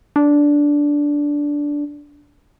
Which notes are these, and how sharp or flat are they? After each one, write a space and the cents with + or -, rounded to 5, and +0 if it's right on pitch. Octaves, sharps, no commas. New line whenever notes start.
D4 -10